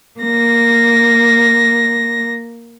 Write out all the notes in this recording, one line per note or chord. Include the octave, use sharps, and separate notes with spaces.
A#3 A#6